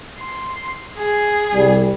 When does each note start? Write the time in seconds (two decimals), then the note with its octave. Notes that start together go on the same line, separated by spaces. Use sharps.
0.20 C6
0.97 G#4
1.54 C2 G3